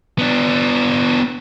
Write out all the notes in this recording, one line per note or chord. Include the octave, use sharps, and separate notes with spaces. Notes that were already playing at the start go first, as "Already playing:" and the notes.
B3 D4